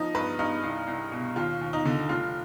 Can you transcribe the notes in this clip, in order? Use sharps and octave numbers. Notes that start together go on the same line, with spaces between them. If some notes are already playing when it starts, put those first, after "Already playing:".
Already playing: F3 D#4
G2 B4
G2 D#4
C2
C2
B2
D#2 F4
D#2
D#4
D3
F1 F4